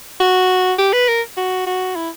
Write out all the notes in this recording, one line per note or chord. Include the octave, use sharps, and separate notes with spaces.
F#4
G4
B4
A#4
F#4
F#4
E4